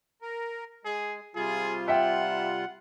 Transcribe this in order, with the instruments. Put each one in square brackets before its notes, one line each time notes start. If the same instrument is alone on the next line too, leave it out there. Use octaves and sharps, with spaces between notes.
[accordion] A#4
[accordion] G#3 [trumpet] G#4
[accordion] C3 G3 F4 [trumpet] G#4
[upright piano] E5 G5 [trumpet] F#5